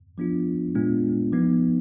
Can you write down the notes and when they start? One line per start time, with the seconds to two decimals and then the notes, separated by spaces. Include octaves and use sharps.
0.18 F3 B3 D4 F4
0.75 A#2 G#3 B3 D4 F4
1.32 F3 B3 D#4